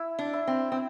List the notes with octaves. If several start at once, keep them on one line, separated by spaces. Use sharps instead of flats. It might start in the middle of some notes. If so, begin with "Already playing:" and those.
Already playing: E4
D4
E4
C4
C4